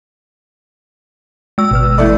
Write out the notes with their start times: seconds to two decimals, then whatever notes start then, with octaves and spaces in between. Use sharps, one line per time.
1.58 G#3 E6
1.71 G#1 B2 B4 F6
1.98 E3 A3 D5